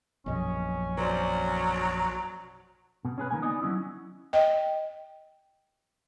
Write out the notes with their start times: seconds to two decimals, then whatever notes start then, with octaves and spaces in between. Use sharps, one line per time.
0.26 A#1 F#2 B2 C#4 D#5
0.98 F#3 C5 D5
3.05 B2
3.18 C#4 G#4 B4
3.31 D#3 A#3 G#5
3.42 B3 D#4 D5 D#5
3.62 F#3 C#4 E4
4.33 D#5 G5